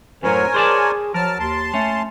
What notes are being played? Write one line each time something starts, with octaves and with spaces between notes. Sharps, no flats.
F#2 A2 F#3 A#4 C5 C#5 G#5
G#4 C5 D5 A5
F3 F#3 A#4 A5 F6
D#2 A5 C6
A3 C#4